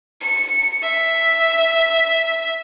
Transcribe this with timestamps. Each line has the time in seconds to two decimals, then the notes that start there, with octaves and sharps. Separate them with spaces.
0.21 C#7
0.83 E5